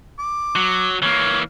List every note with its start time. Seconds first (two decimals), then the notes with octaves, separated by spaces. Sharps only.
0.19 D6
0.56 F#3
1.02 E3 A#3 C#5